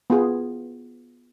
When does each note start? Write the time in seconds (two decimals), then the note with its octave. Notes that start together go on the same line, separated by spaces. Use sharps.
0.10 B3 F4 G#4